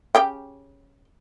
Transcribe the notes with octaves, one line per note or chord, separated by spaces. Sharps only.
C#3 G4 G5